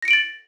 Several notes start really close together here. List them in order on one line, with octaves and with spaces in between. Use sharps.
A#6 C#7 D7 F#7 A6